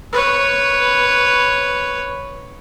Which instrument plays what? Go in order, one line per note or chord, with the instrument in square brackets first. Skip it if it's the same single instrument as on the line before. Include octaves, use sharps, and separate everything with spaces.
[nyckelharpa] B4 C#5